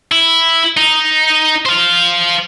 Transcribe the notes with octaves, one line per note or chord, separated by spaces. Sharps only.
E4
D#4
C5 F5